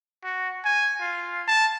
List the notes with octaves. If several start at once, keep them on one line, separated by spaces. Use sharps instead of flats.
F#4
G#5
F4
A5